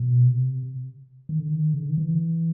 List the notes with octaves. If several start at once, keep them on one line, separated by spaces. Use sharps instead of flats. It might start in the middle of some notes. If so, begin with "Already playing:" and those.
Already playing: B2
C3
D#3
D3
D#3
C#3
D3
D#3
E3